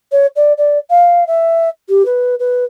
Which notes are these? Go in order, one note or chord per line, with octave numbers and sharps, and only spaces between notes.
C#5
D5
D5
F5
E5
G4
B4
B4